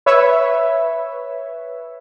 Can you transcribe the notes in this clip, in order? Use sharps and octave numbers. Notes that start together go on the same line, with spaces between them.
B4 C#5 E5